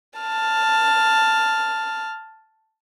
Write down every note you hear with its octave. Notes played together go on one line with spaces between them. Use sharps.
A5 F6